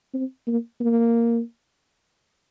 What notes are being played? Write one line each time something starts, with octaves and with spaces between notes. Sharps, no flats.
C4
A#3
A#3